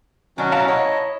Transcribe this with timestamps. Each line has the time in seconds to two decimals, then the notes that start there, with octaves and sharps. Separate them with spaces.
0.38 D#3 F#3 C#4 D4 F#4
0.52 E4 F5 A5 A#5
0.68 C#5 D#5